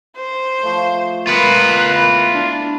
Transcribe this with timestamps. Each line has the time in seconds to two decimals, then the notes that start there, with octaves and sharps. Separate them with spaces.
0.16 C5
0.61 F3 A3 C#5
1.27 B3 F4 A#4 B4 F#6
1.92 E4
2.33 D4